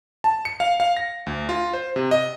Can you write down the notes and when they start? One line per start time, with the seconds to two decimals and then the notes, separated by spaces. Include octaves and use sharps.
0.24 A5
0.45 C#7
0.60 F5
0.80 F5
0.97 A#6
1.26 D2
1.49 F4
1.73 C5
1.96 C3
2.11 D#5